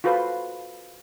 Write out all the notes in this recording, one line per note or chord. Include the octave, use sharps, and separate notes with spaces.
F4 F#4 A4 B4 C5